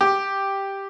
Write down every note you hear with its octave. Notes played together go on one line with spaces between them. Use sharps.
G4